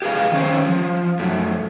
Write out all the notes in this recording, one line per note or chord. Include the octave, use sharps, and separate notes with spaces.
G4 G#4 B4 F5
D#3 C#4 C5
F3
F#2 A3